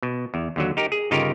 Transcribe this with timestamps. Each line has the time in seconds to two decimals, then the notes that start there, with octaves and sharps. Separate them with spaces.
0.03 B2
0.34 E2
0.56 D#2 D3 F#3
0.77 D#4 G4 A#4
0.92 G#4
1.11 G1 C#3 D#4 F4 G4 A#4